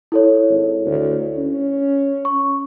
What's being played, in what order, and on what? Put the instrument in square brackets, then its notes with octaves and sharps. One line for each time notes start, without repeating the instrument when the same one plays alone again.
[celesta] E4 A4 C#5
[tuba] G#1
D2
C#4
[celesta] C#6